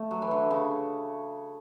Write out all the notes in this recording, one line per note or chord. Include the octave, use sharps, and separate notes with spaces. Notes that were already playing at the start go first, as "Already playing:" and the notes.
Already playing: A3
F#3
E3
D3
C#3